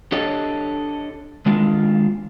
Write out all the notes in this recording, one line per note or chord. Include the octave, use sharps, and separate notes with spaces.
D4 G4 A4 C#5 D#5
D#3 G#3 D4 F4